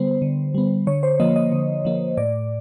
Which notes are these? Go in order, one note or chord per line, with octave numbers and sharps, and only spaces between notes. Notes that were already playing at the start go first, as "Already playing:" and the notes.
Already playing: D3 G3 B3 C5
D3
G3 B3
D3 C#5
C5
F3 A#3 D#5
D#5
D3
F3 A#3
A2 D5